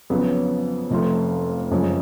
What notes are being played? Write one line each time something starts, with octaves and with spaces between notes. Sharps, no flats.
F2 C#3 F#3 B3
F1 F2 F3 A3 F4
F#1 F2 C#3 G#3